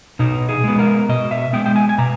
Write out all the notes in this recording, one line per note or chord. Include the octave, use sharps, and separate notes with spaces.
B2 D#4
G#4
G#3 B3
A#4
B2 D#5
E5
G#3 B3 G5
G5
G#5
G#5
B2 A#5